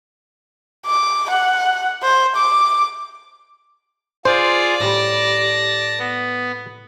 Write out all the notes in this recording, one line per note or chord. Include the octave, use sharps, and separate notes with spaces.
D6
F#5
C5
D6
F4 G#4 C5 D5
A2 G3 A5 A#6
B3